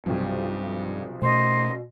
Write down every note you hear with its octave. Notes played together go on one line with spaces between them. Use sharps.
B1 G2 C3 F3
B2 A3 C5 D#5